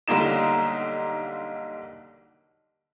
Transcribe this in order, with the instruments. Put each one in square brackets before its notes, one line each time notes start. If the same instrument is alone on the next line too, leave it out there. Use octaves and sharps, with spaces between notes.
[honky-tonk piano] B1 D3 G3 A#3 D#4 E7